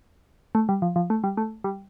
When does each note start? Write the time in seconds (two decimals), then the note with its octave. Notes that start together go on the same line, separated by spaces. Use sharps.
0.55 A3
0.69 G3
0.82 F3
0.96 F3
1.10 A3
1.24 G3
1.37 A3
1.64 G3